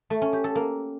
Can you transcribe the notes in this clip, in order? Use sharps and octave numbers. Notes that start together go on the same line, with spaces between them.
A3
C#4
G4
A4
A#3